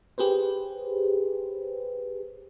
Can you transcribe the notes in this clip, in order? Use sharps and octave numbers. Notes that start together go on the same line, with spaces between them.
G4 G#4 B4 C5